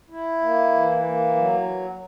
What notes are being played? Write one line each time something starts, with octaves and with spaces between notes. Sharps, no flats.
E4
A#3
E3
A#3
F#3